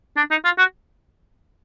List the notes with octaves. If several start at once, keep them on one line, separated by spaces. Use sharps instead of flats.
D4
D#4
F4
F#4